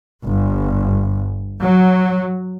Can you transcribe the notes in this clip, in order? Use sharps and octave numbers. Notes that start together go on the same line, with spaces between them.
G1
F#3